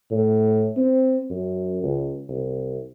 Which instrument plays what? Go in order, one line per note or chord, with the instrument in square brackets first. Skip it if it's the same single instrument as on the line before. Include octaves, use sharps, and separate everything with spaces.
[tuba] A2
C4
F#2
C#2
C2